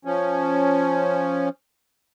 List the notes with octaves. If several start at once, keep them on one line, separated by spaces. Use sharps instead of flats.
F3 C#4